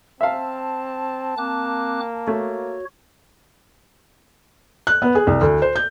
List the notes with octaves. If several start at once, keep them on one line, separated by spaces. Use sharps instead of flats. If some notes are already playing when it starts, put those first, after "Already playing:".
C4 E5 F5 A5
A#3 C4 D6 F#6
A3 F#4 C#5
F#6
B3
G#4
C2
D2
C5
G6